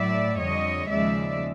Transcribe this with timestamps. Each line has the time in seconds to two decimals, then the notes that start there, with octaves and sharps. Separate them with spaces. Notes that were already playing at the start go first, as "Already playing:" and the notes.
Already playing: A2 F#3 D5 E5
0.40 F2 D3 G3 C#5 D#5
0.89 D#2 C#3 F3 G#3 D5 E5